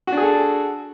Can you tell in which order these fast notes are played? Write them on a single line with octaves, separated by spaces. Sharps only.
F#4 D4 G#4 A4